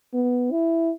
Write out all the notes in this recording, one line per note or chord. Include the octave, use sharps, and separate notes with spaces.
B3
E4